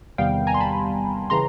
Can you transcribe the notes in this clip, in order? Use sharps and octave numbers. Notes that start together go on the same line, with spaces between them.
E2 C3 D#3 G3 B3 F5 G5
G#5 A#5
C6
A5 B5
C#3 E3 A#5 C6